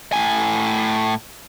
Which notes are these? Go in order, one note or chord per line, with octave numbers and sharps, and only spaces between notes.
A2 G#5